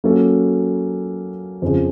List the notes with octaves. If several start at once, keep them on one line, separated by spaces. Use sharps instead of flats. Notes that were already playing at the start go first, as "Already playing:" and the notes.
F#3 A#3 C#4 F#4 A4
F2 C#3 F3